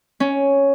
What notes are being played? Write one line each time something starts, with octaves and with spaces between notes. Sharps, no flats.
C#4